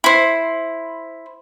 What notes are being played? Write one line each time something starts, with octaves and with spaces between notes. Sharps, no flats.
E4 C5